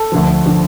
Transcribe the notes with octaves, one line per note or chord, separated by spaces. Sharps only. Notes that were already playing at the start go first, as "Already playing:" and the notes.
Already playing: A4
D2 D3 F3
D3 F3